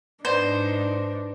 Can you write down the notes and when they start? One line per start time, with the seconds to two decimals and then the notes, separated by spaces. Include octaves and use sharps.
0.25 G#2 D4 D#4 B4 C5 D5